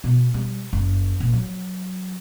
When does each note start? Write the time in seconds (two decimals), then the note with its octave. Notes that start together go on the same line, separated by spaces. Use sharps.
0.04 B2
0.34 G3
0.73 F#1
1.20 A#2
1.33 F#3